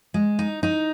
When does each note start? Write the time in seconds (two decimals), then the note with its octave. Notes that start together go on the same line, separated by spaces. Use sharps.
0.14 G#3
0.39 D#4
0.63 D#4